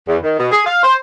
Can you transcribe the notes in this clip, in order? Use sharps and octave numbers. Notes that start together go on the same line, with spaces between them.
E2
D#3
B2
G#4
F5
C5